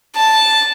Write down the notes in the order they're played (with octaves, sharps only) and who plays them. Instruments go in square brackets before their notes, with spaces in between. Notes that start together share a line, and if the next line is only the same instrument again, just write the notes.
[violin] A5